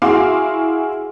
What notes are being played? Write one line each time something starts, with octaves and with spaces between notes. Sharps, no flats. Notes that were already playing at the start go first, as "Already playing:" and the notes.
E4 F#4 G#4 F5 C6 D6